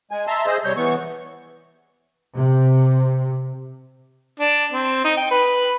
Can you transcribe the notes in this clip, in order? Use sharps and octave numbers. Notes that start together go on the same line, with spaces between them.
G#3 G#5
E5 A5 A#5 C6 E6
G#4 C5 D#5 E6
C3 G3 C#5 G6
E3 B3 C#6
C3
D4
C4
D#4
G5
B4